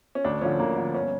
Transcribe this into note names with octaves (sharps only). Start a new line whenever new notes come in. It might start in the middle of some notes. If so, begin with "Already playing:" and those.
C#4
D2 D4
D3 F3 C#4
D2 A#3
D3 F3
G1 C#4